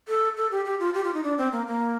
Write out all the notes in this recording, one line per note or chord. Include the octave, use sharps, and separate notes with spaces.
A4
A4
G4
G4
F4
G4
F4
D#4
D4
C4
A#3
A#3